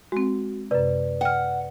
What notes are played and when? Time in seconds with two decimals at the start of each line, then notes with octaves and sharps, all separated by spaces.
0.12 G#3 C4 F#4
0.71 F#2 C3 B4 D5
1.21 F#5 G5 F6